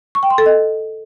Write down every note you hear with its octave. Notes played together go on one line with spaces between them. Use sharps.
C#6
G5
C6
A4
D#5